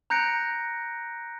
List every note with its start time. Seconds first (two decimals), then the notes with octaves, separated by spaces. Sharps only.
0.10 A#5 F#6 G6 A#6 C#7 D7